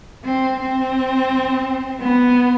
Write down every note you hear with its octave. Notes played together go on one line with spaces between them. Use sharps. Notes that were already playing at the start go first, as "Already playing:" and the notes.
C4
C4
B3